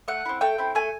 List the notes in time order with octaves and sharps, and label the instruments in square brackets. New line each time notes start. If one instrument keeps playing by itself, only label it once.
[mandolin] A3 F#5
C4 E4
A3 G5
C4 E4
A3 G#5